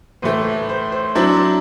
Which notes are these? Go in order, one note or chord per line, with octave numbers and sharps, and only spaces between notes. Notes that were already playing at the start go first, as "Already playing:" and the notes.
A2 E3 A3 C5
C5
C5
F#3 C4 D4 E4 D5